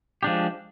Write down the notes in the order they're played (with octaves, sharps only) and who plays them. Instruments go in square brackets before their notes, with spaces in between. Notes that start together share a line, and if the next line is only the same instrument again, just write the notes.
[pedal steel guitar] F3 G#3 D4 G4